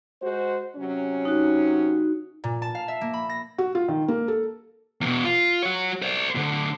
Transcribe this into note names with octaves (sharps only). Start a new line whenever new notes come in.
G#3 F#4 C5
C3 F#3 C#4
D#4 F#4
A#2
A5
F5
E5
A#3
B5
A#6
F#4
F4
D#3
A#3
A4
E2 B2
F4
F#4 C#5
C5 D5
A2 D3